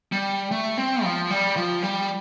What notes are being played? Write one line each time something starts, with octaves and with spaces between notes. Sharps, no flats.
G3
A3
C4
F3
G3
F3
G3